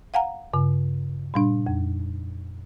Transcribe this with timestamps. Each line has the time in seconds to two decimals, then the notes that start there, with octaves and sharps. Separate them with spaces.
0.14 F5 F#5 G#5 A#5
0.53 G2 C#3
1.34 A#2 G3 D4
1.67 F2